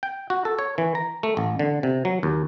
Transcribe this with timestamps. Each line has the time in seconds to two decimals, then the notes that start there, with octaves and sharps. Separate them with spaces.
0.03 G5
0.30 F#4
0.45 A4
0.59 C#5
0.78 E3
0.95 A#5
1.23 A3
1.37 A1
1.59 D3
1.83 C3
2.05 F#3
2.23 D#2